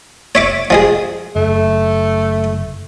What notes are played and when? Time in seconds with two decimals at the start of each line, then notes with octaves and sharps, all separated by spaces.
0.35 C#5 E5 D6
0.70 F3 G#3 G#4
1.36 F#1 A3